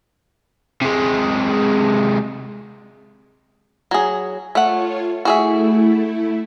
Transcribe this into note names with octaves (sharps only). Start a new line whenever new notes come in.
C3 G#3
F#3 G#4
A3 F4 C#5 F#5
A3 E4 F#4 G#4 E5